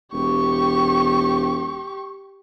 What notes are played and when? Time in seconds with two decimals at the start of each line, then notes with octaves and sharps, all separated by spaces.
0.13 E1 G4 C#6